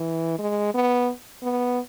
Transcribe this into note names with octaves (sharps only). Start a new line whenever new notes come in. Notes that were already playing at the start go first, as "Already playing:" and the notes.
Already playing: E3
G#3
B3
B3